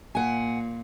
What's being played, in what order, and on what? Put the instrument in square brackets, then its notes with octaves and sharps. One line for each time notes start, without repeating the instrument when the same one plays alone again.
[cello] A#2 [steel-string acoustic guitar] F#5 G#5